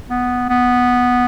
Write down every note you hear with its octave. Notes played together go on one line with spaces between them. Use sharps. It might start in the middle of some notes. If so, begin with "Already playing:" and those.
B3
B3